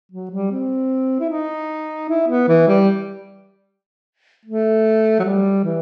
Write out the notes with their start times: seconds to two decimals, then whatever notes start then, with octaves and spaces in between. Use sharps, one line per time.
0.12 F#3
0.31 G3
0.52 C4
1.20 E4
1.30 D#4
2.09 E4
2.28 B3
2.48 E3
2.68 G3
4.46 A3
5.20 F#3
5.24 G3
5.64 E3